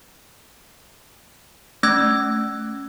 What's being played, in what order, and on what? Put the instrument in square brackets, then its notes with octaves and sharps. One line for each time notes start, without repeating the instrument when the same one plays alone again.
[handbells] A3 C#4 E6 G#6